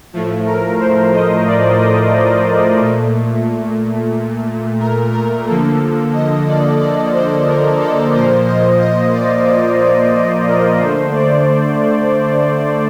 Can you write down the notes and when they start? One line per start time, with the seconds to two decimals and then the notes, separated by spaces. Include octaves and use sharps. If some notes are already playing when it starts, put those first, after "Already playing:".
0.13 A2 F3 A3
0.46 A#4
0.79 C5
1.14 D#5
1.47 D5
1.79 D#5
2.80 A#2 A3
4.79 A#4
5.13 A#4
5.46 D3 F3 A#3 A4
6.13 D#5
6.47 D5
6.79 D5
7.13 C5
7.47 A#4
7.80 A4
8.14 A#2 F3 A#3 C5
8.46 D#5
8.81 D#5
9.14 D5
9.47 D5
9.81 D5
10.14 C5
10.47 A#4
10.80 D3 A3 C5
11.13 D5